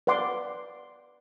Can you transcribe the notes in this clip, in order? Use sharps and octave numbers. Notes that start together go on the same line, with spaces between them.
B4 D5 F#5 C6 D6